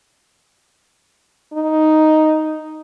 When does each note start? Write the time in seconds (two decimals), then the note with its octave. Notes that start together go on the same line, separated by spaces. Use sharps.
1.54 D#4